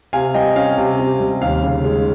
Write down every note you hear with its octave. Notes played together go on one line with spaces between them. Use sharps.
C3 F5 G#5
G3 D#5 G5
C#4 F5
C3
C3
G3
D#2 F5
C#3
G#3